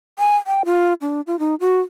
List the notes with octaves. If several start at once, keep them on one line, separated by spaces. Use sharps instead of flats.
G#5
G5
F4
D4
F4
D#4
F#4